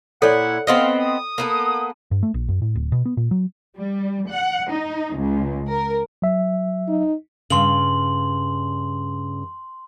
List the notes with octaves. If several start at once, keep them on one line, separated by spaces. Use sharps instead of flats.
A#2 E4 A4 C#5 D5 F#5
B3 C4 D#5 F5
D#6
A#3 B3 A4
G2
A3
A#1
F#2
A2
D1
B2
B3
A#2
F#3
G3
F#5
D#4
C#2
A#4
F#3 E5
D#4
G2 C#3 C6 F#7